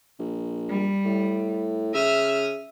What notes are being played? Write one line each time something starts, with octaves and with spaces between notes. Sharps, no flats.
A#1
G3
A2
C#3 E5 D#6 F6